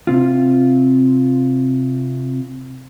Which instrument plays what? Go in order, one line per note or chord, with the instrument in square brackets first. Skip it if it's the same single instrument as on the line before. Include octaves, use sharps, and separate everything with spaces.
[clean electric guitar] C3 C4 F4